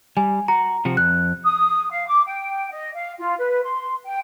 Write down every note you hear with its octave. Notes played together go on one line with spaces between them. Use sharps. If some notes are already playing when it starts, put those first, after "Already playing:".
G3 G#5
F#4 A#5
C3 F3 F#4
F2 F#6
D#6
F5
D6
G5
D#5
F5
F4
B4
C6
G5